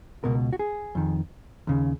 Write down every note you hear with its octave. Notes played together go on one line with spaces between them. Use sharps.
C#2 B2 A#4
F#4
G#4
F2 D#3
D#2 C#3